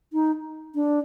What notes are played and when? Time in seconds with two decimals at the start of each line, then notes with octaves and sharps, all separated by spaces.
0.13 D#4
0.75 D4